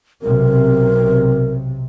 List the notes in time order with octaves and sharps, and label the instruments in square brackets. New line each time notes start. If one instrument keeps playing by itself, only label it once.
[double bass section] B1 C3 [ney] A#4